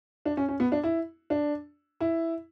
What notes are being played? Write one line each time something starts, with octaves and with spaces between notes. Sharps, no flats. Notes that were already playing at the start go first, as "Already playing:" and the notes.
D4
C#4
C#4
B3
D4
E4
D4
E4